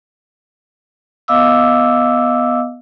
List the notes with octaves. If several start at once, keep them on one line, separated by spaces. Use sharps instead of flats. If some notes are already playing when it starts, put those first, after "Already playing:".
B3 D#5 F5 D6 E6